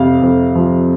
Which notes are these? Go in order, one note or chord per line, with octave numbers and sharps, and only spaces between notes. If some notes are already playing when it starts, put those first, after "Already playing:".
Already playing: F2 C3 F5
F2
F3